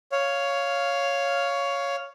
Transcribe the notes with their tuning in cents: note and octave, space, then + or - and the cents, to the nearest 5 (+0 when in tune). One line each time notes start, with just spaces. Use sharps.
C#5 +10 F5 +0